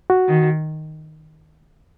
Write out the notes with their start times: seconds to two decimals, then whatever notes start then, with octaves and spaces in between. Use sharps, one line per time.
0.10 F#4
0.28 D#3